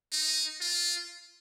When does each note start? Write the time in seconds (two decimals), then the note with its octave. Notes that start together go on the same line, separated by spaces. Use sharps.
0.12 D#4
0.61 F4